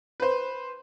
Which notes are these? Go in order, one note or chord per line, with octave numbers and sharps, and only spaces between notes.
B4 C5